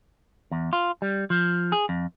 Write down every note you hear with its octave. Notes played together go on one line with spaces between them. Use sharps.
E2
F4
G3
F3
G#4
F2